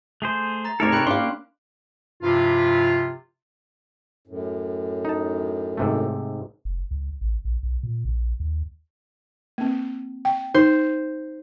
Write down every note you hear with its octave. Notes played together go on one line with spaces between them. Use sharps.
A3 G#4 C5
A#5 A6
D2 C#3 C4 D#4 G4 A4 A#4 C#5
C3 D4 G5 B5 F#6
A#3 C#4 D4 F5 C6
G2 C3 F3 E4 F4
F#2 A2
D#4 A5
G#2 C3 A3
F1
C#2
A1
A#1
B1
A#2
A#1
D#2
A#3 C4
G5
D#4 C5